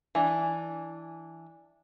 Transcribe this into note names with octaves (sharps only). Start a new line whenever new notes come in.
E3 D4